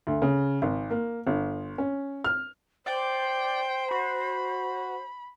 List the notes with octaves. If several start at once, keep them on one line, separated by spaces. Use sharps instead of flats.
D2
C#3
G#1
A#3
G1
C#4
F6
C5 D5 G5
F#4 B5